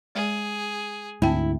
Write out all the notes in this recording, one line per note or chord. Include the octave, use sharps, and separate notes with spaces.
G#3 G#4 D5
D2 G#2 C4 E4 G5 A5